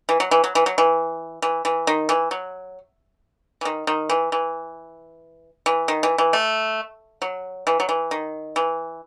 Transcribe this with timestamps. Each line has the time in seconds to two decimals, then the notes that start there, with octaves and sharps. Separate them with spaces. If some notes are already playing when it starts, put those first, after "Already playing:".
0.09 E3
0.20 F#3
0.31 E3
0.44 F#3
0.55 E3
0.66 F#3
0.78 E3
1.42 E3
1.65 E3
1.87 D#3
2.09 E3
2.31 F#3
3.61 E3
3.65 D#3
3.87 D#3
4.09 E3
4.32 E3
5.66 E3
5.88 D#3
6.03 E3
6.18 E3
6.33 A3
7.22 F#3
7.67 E3
7.80 F#3
7.89 E3
8.11 D#3
8.56 E3